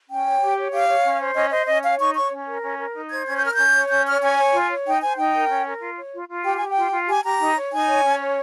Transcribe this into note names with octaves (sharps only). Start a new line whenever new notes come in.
C#4 G5
C#5
G4
C#5
G4 F5
C#5
C#4
C5
C#4 D#5
C5 D#5
C#4 D#5
C#5 F5
D#4 C#6
C#5 C#6
C#4
A#4
C#4
A#4
D#4
C5 G#6
C#4 G#6
G6
A#4 F6
C#4 G6
C#5
C#4 G6
C#5 F6
C#4 G#5
C#5
F4
C#5
D#4 G5
C5 G#5
D#4 G5
A#4
C#4
A#4
F4
C#5
F4
F4
G4 G5
G4 G#5
G5
F4
F4
G4 G#5
G4 A#5
D#4
C#5
D#4 G#5
C#5
C#4
C#5